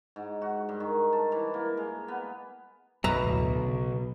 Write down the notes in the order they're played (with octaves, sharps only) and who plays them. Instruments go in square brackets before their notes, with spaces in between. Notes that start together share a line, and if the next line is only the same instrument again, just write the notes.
[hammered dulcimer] G#2
F#4
G2
D#3
A5
E3
A#3
G#3
B3
[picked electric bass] B1 [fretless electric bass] F#2 [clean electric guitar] B2 [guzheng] B4 E5 A#5
[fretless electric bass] D2 A2
C#3